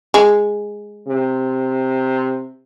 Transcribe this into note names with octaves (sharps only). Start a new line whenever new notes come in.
G#3
C3